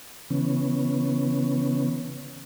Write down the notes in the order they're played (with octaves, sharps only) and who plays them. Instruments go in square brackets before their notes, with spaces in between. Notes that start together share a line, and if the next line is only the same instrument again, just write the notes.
[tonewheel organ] C#3 E3 B3 C#4